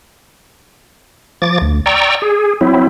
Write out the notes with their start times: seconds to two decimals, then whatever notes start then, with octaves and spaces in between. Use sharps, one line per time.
1.42 F3 D6 A6
1.61 D2
1.86 D5 G5 A#5 C#6 E6
2.22 G#4
2.61 F#3 C4 E4